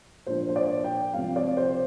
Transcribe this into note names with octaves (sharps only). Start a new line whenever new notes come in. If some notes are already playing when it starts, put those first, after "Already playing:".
A#2 F3 A#3 D4 C5
C5
D5
G5
C2 C3 F3 C4 F5
D5
C5